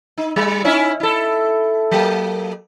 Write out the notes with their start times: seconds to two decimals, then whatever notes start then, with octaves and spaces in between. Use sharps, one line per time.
0.18 D#4
0.36 G3
0.64 C#4 D#4 E4
1.00 E4 A4
1.91 F#3 A#3